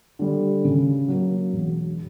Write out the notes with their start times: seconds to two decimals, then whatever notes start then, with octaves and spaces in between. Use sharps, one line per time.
0.19 D3 G3
0.64 C#3
1.08 F#3 A#3
1.53 E1